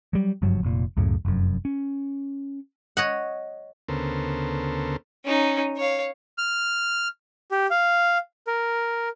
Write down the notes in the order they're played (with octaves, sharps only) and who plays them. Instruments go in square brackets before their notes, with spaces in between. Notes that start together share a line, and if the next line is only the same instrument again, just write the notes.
[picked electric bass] F#3 G3
F#1 G2 F3 F#3
F1 A#2
C#2 F#2 A2 C#3
F1 F#2
C#4
[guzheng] C#5 D#5 F#5
[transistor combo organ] D2 C#3 B3 A4 A#4 C5
[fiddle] C#4 D#4
C#5 F5
[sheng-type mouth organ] F6
G4
F5
A#4